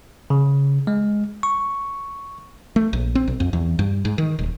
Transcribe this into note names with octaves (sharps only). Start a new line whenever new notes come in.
C#3
G#3
C#6
A3
A#1
C4
B1
F2
E2
G2
G#2
D#3
D#1